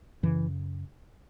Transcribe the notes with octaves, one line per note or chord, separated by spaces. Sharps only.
F#2 C#3 E3